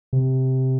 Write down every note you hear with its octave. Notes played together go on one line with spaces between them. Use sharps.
C3